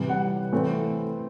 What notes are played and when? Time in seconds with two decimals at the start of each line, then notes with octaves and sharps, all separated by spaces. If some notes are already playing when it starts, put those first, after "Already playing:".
Already playing: C3 E3 G3
0.09 F#5
0.53 E3 A3 C4